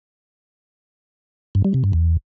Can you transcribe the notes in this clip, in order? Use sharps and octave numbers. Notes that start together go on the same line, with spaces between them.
G2
G3
C3
G2
E2